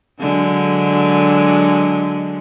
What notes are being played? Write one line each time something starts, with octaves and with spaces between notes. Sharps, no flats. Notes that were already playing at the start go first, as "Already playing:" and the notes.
D3 F#3 G#3